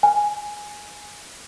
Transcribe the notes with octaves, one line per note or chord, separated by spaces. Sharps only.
G#5